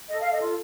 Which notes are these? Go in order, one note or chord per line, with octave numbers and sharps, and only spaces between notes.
A4 D#5
A4 F5
D#5
F4